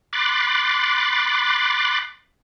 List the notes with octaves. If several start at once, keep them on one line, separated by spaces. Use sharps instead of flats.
B5 C6 D6 F#6 A6